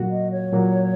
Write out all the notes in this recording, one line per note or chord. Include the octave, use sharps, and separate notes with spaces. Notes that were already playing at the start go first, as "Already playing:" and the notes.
Already playing: A#2 F#3 A#3 F#4
D#5
C#5
A#2 F#3 A#3 F#4